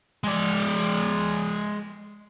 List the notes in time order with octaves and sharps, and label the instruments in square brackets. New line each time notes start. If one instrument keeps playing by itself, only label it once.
[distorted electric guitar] G#3 D5